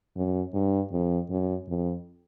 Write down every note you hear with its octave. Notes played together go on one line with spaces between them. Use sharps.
F#2
G2
F2
F#2
F2